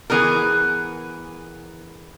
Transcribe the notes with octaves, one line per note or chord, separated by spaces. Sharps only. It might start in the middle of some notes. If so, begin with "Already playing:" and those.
E3 B3 G#4 A#4